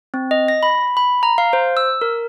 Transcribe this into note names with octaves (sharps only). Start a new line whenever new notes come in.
C4
D#5
A#6
B5
B5
A#5
F5
C5
E6
A#4